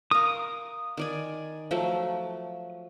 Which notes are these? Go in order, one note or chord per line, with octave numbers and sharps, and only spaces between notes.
A#4 F5 D#6
D#3 D5 G#5
F3 F#3 A3